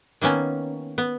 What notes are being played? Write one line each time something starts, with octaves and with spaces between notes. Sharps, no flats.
D#3 A#3 B3 C#4
B3